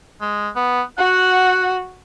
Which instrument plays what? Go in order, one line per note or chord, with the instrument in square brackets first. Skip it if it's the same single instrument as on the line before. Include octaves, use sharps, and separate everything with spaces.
[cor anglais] G#3
B3
[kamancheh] F#4 [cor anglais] F#5